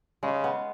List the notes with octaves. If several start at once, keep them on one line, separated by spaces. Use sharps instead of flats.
C#3 G#3
B3